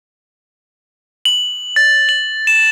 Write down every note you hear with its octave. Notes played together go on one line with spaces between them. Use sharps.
F#7
A6
F#7
E7